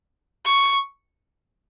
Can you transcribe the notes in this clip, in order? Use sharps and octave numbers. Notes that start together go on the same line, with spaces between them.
C#6